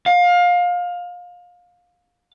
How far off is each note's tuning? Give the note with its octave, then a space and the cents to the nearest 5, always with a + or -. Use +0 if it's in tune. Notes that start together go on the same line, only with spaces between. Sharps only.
F5 +25